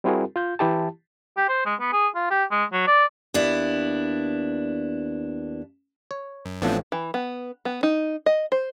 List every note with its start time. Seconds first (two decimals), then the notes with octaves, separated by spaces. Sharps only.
0.04 G3 C4 E4 F#4 G#4 A#4
0.36 F4 G6
0.59 E3 E4 G4 A5
1.37 G4
1.49 C5
1.66 G#3
1.80 B3
1.93 G#4
2.15 F4
2.31 G4
2.51 G#3
2.73 F#3
2.87 D5
3.34 D#2 B3 D4 E4
6.11 C#5
6.45 F#2
6.62 A1 A2 F3 B3 C4 D4
6.92 E3
7.14 B3
7.65 B3
7.83 D#4
8.26 D#5
8.52 C5